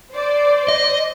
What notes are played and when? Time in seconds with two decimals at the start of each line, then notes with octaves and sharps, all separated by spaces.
0.13 C5 D5
0.68 D#5